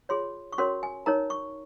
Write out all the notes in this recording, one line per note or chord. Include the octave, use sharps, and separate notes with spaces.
F4 G#4 C#5 C6
C#6
C#4 F#4 A#4 C#5 C6
G#5
D#4 A#4 C#5 A#5
C#6